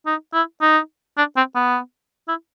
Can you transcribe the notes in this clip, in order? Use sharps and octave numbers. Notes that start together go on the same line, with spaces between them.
D#4
E4
D#4
D4
C4
B3
E4